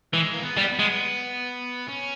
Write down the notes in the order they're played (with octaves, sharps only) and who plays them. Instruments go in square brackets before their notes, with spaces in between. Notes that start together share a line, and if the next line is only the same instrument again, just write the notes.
[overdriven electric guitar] E3 [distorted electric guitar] G#3
[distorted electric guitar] A#3
B3
[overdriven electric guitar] G3
[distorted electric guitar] B3
[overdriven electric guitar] G#3
[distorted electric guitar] C#4